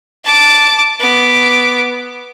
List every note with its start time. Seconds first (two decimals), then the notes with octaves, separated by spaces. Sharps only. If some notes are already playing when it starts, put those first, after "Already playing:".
0.24 A5 D6
1.00 B3 D6